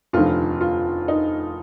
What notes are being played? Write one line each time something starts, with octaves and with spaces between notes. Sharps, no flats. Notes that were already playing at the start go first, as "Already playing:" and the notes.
F1 D#2 D3 F3 F4
F4
D#4